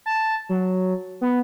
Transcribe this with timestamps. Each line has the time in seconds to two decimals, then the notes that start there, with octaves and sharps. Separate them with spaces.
0.06 A5
0.49 F#3
1.21 B3